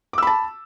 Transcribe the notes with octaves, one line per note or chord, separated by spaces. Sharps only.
A5 B5 D6 E6